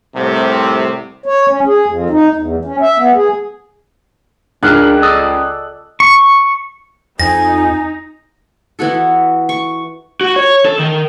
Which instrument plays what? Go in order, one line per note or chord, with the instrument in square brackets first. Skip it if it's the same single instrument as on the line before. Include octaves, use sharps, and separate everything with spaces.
[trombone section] C2 A2 C3
[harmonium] C#5
C#4
G#4
F2
D#4
E2
C#4
E5
B3
G#4
[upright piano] C#2 C#3 F#6 [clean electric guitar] D4 A#4
[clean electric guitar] A4 D5 D#5
[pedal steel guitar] C#6
[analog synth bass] F2 [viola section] D#4 [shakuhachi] G#5 [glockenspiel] A#6
[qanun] E3 B3 F#4 A4
C#6
[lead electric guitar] F#4
C#5
A4
D#3